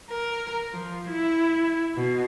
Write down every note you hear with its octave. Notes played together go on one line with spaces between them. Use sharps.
A#4
F3
E4
B2